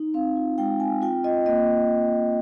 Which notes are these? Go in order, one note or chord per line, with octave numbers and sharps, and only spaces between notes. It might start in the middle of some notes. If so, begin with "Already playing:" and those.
Already playing: D#4
C4 F5
F4
G#3 G5
C4 G#5
F4 G5
F4 D#5
A#3 D#5